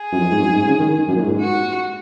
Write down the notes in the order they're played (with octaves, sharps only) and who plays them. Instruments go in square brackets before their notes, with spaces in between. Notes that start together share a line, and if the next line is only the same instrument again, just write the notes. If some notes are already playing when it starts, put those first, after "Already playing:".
Already playing: [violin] G#4
[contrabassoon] F#2
F2
G#2
F#2
G#2
C#3
D#3
F#2
A#2
G#2
[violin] F#4